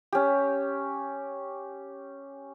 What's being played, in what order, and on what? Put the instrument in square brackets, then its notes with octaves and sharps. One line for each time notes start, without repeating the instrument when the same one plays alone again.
[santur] C#4 G4